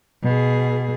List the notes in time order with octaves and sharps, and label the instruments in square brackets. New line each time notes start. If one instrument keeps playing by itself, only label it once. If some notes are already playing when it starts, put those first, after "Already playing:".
[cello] B2 G#4